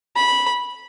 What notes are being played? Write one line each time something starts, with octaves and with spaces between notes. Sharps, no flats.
B5